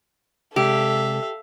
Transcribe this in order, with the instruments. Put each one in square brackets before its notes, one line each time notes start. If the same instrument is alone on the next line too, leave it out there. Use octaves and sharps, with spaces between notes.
[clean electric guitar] C3 G#3 D5 [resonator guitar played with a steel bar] G4 [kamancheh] A4 [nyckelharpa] E5 F5